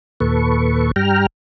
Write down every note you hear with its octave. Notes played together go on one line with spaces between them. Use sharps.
D#2 A#2 A4 B4 C#6
G2 G3 G5 A#5 F6